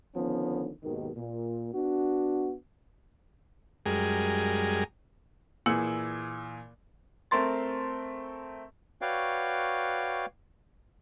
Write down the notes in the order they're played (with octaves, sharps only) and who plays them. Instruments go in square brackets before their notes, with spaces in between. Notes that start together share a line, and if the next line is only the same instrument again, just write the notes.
[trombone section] D3 D#3 F3 B3 C#4
D#2 G#2 B2 D#3
A#2
B3 D4 F#4
[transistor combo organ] F#2 G3 G#3 G#4 A#4
[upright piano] A#2 E3 G#4 E6 C#7 F#7
[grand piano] A3 C4 A#4 C6 A6
[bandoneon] F#4 B4 C#5 D5 F5 G5